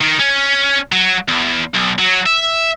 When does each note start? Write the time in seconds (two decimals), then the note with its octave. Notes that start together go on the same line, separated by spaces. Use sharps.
0.01 D#3
0.20 C#4
0.92 F#3
1.28 E2
1.74 B1
1.99 F#3
2.26 E5